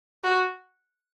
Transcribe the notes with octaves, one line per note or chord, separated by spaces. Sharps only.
F#4